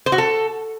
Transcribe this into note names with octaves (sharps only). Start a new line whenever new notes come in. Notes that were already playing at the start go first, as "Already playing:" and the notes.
C5
F#4
A4